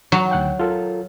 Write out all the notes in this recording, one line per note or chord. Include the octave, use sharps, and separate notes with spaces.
F#3
D2 F#5 G5
F4 A4 A#4